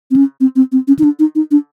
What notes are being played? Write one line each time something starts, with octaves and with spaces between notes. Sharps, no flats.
C4
C#4
C4
C4
C4
C#4
D#4
D4
D#4
D#4
D4